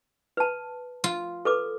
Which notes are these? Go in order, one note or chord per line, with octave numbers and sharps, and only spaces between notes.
B4 A5
F4
A4 B4 D6